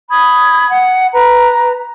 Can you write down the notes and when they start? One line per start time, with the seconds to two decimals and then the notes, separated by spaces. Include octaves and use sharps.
0.11 B5 D#6 G#6
0.70 F#5
1.13 B4 A#5